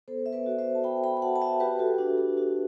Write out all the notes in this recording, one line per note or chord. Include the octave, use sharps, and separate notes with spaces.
B3 A4 C5
E5
B4 D5
F#4
C5 E5
A5
F#4 G5 B5
G5 B5
B5
F#4 F#5 A5
A5
E5 G5
F#4 G4 B4
F#4 A4
D4 F#4
G4
D4 F#4